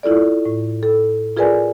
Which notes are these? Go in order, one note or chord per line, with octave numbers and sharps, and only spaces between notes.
E4 F4 A4 D5
A2
A4
F4 G#4 A#4 B4 D5 G#5